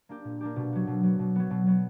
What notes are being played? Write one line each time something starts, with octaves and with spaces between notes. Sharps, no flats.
A#3 D4 G4
A#2
A#3 D4 G4
B2
F#3 B3
B2
F#3 B3
B2
F#3 B3
B2
F#3 B3